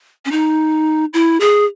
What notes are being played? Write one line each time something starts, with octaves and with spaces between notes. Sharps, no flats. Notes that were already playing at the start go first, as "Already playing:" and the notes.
C#4
D#4
E4
G#4